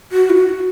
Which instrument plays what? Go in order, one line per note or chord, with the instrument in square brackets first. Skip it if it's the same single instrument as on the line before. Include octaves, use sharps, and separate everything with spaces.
[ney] F#4
E4
F#4